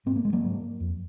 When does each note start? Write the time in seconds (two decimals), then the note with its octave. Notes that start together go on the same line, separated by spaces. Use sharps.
0.06 G#2 C4
0.16 A#3
0.25 G#3
0.33 F#3 A#3
0.43 G#2
0.80 F2